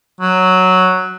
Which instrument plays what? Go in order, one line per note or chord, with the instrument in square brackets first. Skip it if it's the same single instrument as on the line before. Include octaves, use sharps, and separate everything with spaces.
[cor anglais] F#3